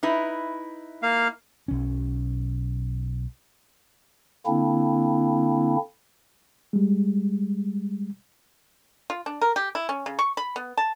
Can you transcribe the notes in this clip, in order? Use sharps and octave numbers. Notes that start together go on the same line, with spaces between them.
D#4 E4 B4
A#3 F5
B1 C#4
D3 A#3 C4 D4 E4
G3 G#3
F4
D4
A#4
G4
E4
C#4
C#3
C#6
B5
B3
A5